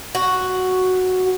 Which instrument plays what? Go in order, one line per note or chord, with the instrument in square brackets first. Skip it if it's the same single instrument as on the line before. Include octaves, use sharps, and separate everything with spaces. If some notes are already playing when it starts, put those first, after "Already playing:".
[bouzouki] F#4